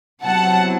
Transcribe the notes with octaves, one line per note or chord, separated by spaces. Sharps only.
C3 F#3 B3 E4 F#5 A5